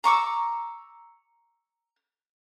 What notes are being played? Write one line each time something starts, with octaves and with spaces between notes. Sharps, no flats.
A#5 C#6 D6 E6